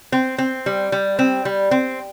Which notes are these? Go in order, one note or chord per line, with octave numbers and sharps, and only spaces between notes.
C4
C4
G3
G3
C4
G3
C4